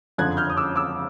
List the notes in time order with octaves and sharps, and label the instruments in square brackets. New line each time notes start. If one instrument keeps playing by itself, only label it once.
[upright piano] F#1 F2 D3 F3 F#6 G#6
F6 G6
D#6
D6 E6
D6 E6